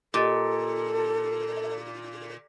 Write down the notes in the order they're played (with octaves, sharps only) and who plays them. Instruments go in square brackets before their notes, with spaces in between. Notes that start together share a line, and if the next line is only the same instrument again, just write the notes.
[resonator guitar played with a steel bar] A#2 [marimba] G4 D#5 A6 [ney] A4